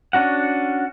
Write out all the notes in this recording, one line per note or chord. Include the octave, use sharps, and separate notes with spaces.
C#4 D4 F#4 F#5